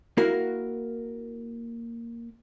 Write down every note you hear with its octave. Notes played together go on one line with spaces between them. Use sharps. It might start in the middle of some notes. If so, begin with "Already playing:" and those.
A#3 E4 F#4 A#4 F5